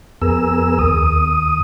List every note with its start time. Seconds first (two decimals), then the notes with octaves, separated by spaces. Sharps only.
0.22 F2 B3 G#4 A#4 E6
0.79 D#2 D#6